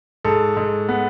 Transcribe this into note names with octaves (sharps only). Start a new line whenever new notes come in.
G#2 A4
G#2
B3